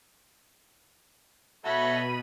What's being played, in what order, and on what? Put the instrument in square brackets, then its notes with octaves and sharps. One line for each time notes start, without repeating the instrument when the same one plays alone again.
[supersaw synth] B2 D#7 [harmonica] F#4 A4 C#5 [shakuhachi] E5 [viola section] B5